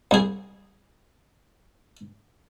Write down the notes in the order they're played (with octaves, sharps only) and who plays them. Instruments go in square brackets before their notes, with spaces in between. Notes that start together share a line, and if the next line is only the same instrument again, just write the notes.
[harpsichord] C2 G#4